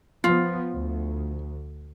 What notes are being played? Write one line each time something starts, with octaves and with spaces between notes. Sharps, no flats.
F3 B3 F4
D2